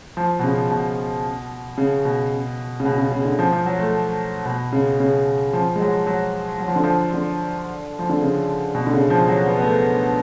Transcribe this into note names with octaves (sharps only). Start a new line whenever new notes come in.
F3
B2
C#3
B2
C#3
B2
C#3
B2
C#3
C#3
D3
F3
F3
F#3
A3
B2
C#3
C#3
F3
G#3
F#3
F#3
F#3
F3
D3
F3
D3
F3
D3
C#3
B2
D3
C#3
F3
F#3
B3
B3
A3